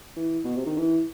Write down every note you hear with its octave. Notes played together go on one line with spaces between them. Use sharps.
E3
B2
C3
D#3
E3